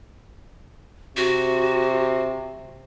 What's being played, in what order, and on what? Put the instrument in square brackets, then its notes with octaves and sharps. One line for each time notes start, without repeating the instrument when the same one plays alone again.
[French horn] C3 [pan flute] F#4